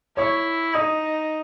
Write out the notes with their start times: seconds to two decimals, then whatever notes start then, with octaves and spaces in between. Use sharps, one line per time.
0.17 E4 C#5 C#6
0.74 D#4 D#5 D#6